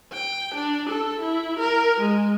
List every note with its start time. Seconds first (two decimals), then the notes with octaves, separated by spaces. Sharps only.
0.13 G5
0.55 D4
0.90 A4
1.20 E4
1.60 A#4
2.01 G#3